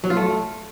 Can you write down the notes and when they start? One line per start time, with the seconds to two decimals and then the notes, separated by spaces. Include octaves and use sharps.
0.04 F#3
0.10 F4
0.17 A3